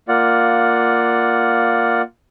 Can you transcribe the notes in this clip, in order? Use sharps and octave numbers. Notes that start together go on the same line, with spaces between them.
A#3 F4 D5 F#5